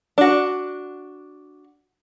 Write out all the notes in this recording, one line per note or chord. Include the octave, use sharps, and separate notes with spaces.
D4 F#4